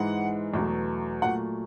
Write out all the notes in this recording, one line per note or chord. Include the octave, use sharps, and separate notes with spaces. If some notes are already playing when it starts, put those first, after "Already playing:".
Already playing: G#2 E3 G#3 F#5
E2 B2 F#3 A3
A#2 F#3 A3 F#5